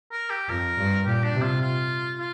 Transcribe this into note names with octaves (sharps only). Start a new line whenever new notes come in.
A#4
G4
F2 A#4
G2
A#2 G4
D4
C3
F4
F4
F4